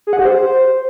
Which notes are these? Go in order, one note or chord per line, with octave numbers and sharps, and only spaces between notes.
G#4
F#5
G4
C5